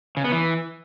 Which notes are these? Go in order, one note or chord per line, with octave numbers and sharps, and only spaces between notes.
C#3
B3
E3